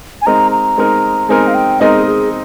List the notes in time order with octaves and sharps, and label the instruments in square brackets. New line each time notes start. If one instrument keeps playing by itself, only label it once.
[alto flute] G#5
[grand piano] G#3 C4 D#4 A#4 D#5 [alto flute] A#5
[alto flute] A#5
[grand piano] G#3 C4 D#4 A#4 D#5
[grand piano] G#3 C4 D#4 A#4 D#5 [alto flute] G#5
[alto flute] F5
G5
[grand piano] G#3 C4 D#4 A#4 D#5 [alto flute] G#4
[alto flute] G#4